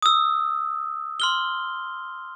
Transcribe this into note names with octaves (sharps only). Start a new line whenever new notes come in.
D#6 E6
C6 F6 G7